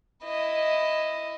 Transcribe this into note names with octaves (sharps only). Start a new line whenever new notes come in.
E4 D#5